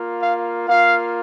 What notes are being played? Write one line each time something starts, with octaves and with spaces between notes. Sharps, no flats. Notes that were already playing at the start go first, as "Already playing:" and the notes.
Already playing: A#3 F4
F5
A#3 F4 F5